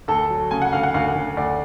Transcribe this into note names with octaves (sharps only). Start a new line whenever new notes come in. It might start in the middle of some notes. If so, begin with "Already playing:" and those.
D2 A4
F#3
C#3 G#5
F#5
D2 F5
F#5
D2 F5
D2
D2 D5